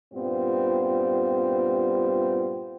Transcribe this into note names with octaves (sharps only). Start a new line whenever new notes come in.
G2 A#2 G3 B3 C4 F4